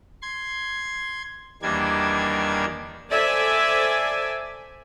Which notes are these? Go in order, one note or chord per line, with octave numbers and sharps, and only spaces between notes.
C6 G#6
E2 D#3 G3 A#3 D4 G#6
A4 C5 D5 E5 G#5